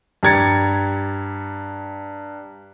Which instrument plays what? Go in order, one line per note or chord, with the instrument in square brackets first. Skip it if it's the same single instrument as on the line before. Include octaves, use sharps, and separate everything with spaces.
[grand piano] G2 G4 A#5 G#6 A6 C#7